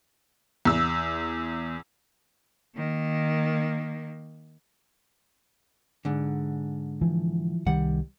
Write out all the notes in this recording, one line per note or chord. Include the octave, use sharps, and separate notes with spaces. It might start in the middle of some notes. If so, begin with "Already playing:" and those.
E2 E6
D#3 A#3
G#2 D3
E3 F3
C2 D#3 G3 F#5